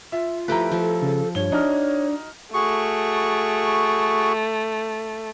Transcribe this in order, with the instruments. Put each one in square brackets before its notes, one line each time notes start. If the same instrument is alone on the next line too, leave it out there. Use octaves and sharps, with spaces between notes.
[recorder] F4 [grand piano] E5
[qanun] F3 G4 B4 [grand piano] A3 E4 A#5
[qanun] F3 [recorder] A4
[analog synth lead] C#3
[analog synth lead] G2 [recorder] C#5 [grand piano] G7
[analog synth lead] D4 [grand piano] D#4 F6 [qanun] F#4
[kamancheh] A3 [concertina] F#4 G#4 C#6